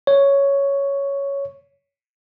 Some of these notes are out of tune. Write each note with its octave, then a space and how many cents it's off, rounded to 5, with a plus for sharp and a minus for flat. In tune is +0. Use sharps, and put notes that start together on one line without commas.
C#5 +5